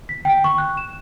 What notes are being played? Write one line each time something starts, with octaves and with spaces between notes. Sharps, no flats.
B6
G5
C#6
F#6
E7